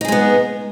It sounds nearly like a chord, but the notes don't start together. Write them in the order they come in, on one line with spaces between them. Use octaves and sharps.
D#4 G#4 G#3 B3